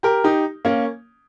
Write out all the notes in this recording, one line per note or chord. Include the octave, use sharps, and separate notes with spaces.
G4 A#4
D#4 G4
A#3 C#4